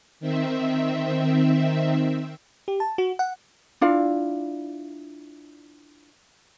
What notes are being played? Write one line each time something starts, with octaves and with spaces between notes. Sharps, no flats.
D#3 C4 E5
G4
A5
F#4
F#5
D4 E4 F4 F5